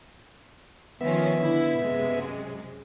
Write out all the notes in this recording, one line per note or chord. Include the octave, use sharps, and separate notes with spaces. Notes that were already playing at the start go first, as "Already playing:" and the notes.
D#3 F3 B3 C#4 E5
D3 E4
F#2 C3 G#3